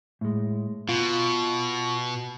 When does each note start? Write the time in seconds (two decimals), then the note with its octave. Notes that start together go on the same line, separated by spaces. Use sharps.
0.21 A2 G#3
0.89 B2 F4